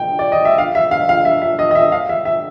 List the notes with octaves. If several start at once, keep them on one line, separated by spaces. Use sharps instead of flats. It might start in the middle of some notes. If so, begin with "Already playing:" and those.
Already playing: G5
D5
D#5
E5
F5
E5
F5
F5
E5
E5
D#5
D#5
E5
F5
E5
E5